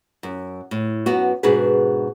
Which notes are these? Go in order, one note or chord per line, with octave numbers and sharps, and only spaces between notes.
F#2
A2
F#2 B3 F#4
G#2 B2 D4 F#4 G#4 B4